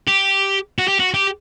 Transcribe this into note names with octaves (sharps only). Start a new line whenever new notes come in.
G4
F#4
G4
F#4
G4